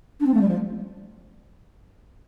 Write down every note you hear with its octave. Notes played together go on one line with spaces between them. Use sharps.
D4
C4
A3
G3
F3